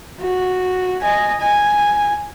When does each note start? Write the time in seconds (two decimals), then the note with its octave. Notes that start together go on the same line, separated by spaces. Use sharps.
0.21 F#4
1.02 D#5 G#5
1.40 G#5